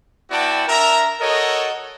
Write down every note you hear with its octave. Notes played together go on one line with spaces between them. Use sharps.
B3 E4 F#4 D5 G5 A5
D4 A#4 E5 A#5
F#4 A4 A#4 C#5 D#5